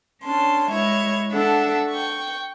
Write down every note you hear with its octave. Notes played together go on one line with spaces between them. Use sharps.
C#4 D4 A5 C6
G#3 E4 C#5 E5
D4 A4 E5 F#5
G5 C#6